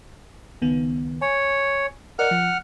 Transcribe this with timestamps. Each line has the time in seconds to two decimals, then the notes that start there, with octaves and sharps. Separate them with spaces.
0.62 C#2 D#3 B3
1.21 C#5 G#5
2.19 A#4 D5 D#5 F#5 F6
2.31 F3